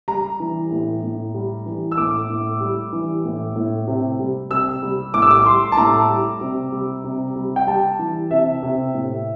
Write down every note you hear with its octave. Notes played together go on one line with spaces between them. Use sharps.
G3 A#5
E3
A2
A2
G3
E3
E6
A2 D6
A2
G3
E3
A2
A2
C3
G3
C3 E6
G3
A2 D6
E6
D6
G3 C6
A5
A2 A#5
G3
C3
G3
C3
G3
G5
G3 A5
E3
C3 E5
C3
A2